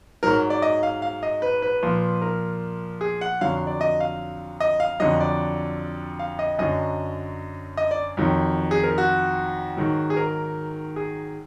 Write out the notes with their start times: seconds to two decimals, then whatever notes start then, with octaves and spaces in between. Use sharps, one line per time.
0.23 G#2 F#3 A#4
0.50 D5
0.62 D#5
0.83 F5
1.02 F5
1.23 D#5
1.42 B4
1.62 B4
1.83 A#2 F3
2.22 A#4
3.01 G#4
3.21 F#5
3.41 F2 D3 F#3 F5
3.67 D5
3.81 D#5
4.00 F5
4.60 D#5
4.80 F5
5.00 F2 D3 F#3 D#5
5.20 D5
6.19 F5
6.39 D#5
6.59 F#2 D3 F#3 D#5
7.77 D#5
7.91 D5
8.17 F2 D#3 F#3
8.71 G#4
8.83 A#4
8.98 F#4
9.77 G#2 D#3 F#3
10.10 G#4
10.16 A#4
10.96 G#4